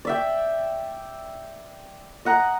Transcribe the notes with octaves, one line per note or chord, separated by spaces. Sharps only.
D5 E5 G5
D#5 F#5 A#5